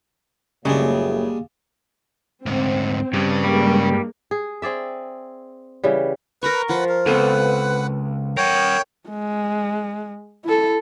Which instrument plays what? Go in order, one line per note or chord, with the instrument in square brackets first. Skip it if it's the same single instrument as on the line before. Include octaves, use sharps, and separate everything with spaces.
[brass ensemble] F#1 A2 [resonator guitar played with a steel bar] C#3 [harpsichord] G3 G#3 D4 [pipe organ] A#3
[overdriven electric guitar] D2 G#2 [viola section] C4
[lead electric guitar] G2 [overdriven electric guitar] C#3
[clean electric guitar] G3 [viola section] G#3 A#3
[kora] G#4
C4 G#4 D5 E5
C#3 E3 G3
[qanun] A#4 A#5 C#6 [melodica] B4
[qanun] F3 [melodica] B4 F#5
[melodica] A#4
[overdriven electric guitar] C#2 [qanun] B3 C4 A4 [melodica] B4 F#5
[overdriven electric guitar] A#4 F#5 [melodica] C#5 G5
[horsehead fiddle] G#3
E4 A4